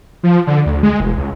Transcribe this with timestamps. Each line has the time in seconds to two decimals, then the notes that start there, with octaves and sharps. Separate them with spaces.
0.23 F3
0.47 D3
0.66 D2
0.83 G#3
1.00 E1
1.18 C#2